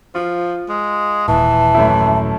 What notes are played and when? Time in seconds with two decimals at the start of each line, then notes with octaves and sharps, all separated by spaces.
0.15 F3 F4
0.69 G#3
1.28 D#1 A#2 E3 A5
1.74 F#2 A3 E4